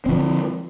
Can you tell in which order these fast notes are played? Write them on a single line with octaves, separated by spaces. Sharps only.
C4 D3 F3